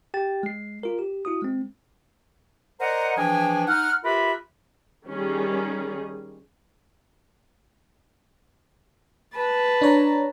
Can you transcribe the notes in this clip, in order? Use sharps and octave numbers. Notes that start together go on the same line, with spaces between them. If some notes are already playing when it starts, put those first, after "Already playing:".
G4 G5 A6
G#3 C7
F4 A#4
G4
E4 F#4 D#6
G#3 C4
A#4 C5 D5 D#5 F#5 A#5
E3 F3 D4 G#4 G5 G#5
D#4 F#5 F6
F4 G4 A#4 B4 E5 B5
D#3 G3 C#4 G#4
B4 A5
D4 C#5 A#5